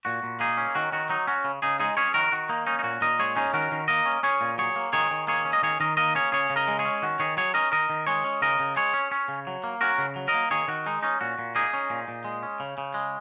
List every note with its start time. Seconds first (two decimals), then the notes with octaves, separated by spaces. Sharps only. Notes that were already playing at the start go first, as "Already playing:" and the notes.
0.05 A#2 F#4
0.23 A#2
0.40 A#3 D#4 G#4
0.58 C#4
0.75 D#3 F#4
0.92 D#3 F#4
1.09 F#3 D#4
1.27 C#4 F#4
1.44 C#3
1.62 C#3 D#4 G#4
1.80 G#3 D#4 G#4
1.97 C#4 G#4 C#5
2.14 D#3 F#4 A#4
2.32 D#3 F#4
2.49 A#3 D#4
2.67 C#4 D#4
2.79 D#4
2.84 A#2 F#4
3.01 A#2 A#4 D#5
3.19 G#3 G#4 C#5
3.36 C#4 D#4 G#4
3.53 D#3 F#4 A#4
3.72 D#3
3.88 A#3 A#4 D#5
4.06 C#4
4.23 C#4 G#4 C#5
4.41 A#2
4.58 F#3 G#4 C#5
4.76 A#3
4.93 D#3 G#4 C#5
5.11 D#3
5.27 A#3 G#4 C#5
5.45 C#4
5.53 D#5
5.63 D#3 G#4 C#5
5.80 D#3 A#4 D#5
5.97 A#3 A#4 D#5
6.15 C#4 G#4 C#5
6.32 C#3 G#4 C#5
6.50 C#3
6.56 A#4 D#5
6.68 G#3
6.79 G#4 C#5
6.85 C#4
7.02 D#3 F#4
7.20 D#3 G#4 C#5
7.37 F#3 G#4 C#5
7.54 C#4 A#4 D#5
7.72 D#3 A#4 D#5
7.90 D#3
8.07 G#3 G#4 C#5
8.24 C#4
8.42 C#3 A#4 D#5
8.60 C#3
8.76 G#3 G#4 C#5
8.94 C#4
9.12 C#4
9.28 C#3
9.47 F#3
9.64 A#3
9.81 C#4 F#4 A#4
9.98 C#3
10.16 F#3
10.28 A#4 D#5
10.34 A#3
10.51 D#3 G#4 C#5
10.68 D#3 F#4
10.86 G#3 D#4
11.03 C#4 D#4
11.21 A#2 F#4
11.39 A#2
11.55 A#3 D#4 G#4
11.73 C#4
11.90 A#2
12.08 A#2
12.25 G#3
12.43 C#4
12.60 C#3
12.78 C#3
12.94 G#3